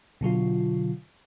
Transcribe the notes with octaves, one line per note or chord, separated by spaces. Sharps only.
B2 D3 F#3 F4